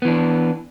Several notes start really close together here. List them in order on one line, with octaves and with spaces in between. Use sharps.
B3 E3 D4